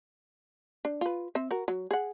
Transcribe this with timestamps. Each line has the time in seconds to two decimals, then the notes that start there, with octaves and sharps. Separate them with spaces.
0.85 D4
1.01 F4 B4
1.35 C4 E5
1.51 F#4 A#4
1.68 F#3
1.91 G#4 F#5